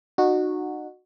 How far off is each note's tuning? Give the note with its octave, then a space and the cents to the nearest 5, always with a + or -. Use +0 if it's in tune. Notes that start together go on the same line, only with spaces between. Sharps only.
D#4 -35 F#4 -10